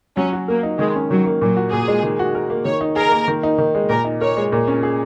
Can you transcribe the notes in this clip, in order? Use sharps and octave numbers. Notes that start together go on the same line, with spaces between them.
F#3 C#4
F#4
A#3 A#4
D#4
D#3 G#3
C#4
D#3 F#3
A#3
A#2 F#3
F#4
A#2 G#4
G#3
D#3
F#4
A#4
A#3
D#3 C#5
D#4
G#4 A#4
A#3
D#3
D#4
D#3
G#3
A#2 A#4
D#4
A#4 C#5
G#3
A#2
C#4
G#4